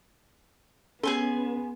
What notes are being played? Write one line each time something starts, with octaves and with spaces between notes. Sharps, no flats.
B3 C#4 G#4 A4 G#5 C6